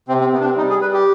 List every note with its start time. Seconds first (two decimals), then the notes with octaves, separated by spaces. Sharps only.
0.08 C3 C4
0.20 C4
0.33 C3 B3
0.40 D4
0.44 C4
0.57 G3 D#4
0.69 G#4
0.81 G3 B4
0.93 G4